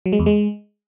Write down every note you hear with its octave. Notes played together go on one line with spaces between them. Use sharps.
F#3
G#3
E2
G#3